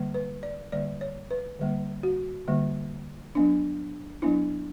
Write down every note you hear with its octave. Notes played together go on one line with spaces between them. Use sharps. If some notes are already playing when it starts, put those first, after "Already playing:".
Already playing: D3 G3 A#3
B4
D5
D3 G3 A#3 D5
C#5
B4
D3 G3 A#3
F#4
D3 G3 A#3
F#3 B3 D4
F#3 B3 D4 E4